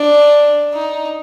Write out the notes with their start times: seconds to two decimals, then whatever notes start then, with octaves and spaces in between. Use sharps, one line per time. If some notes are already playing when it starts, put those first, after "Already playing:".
Already playing: D4
0.74 D#4